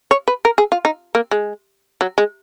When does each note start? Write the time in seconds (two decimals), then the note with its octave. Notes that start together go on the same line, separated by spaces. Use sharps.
0.11 C#5
0.28 B4
0.45 A#4
0.58 G#4
0.72 F4
0.85 D#4
1.15 A#3
1.31 G#3
2.01 F#3
2.18 G#3